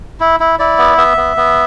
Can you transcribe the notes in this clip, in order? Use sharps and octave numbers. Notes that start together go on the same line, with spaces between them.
E4
E4
E4 D5
B3
B3 E5
B3
B3